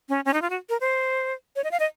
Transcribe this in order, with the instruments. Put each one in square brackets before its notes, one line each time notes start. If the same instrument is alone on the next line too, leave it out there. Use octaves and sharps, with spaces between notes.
[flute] C#4
C#4
D#4
F4
F#4
A#4
C5
C#5
D#5
F5
D#5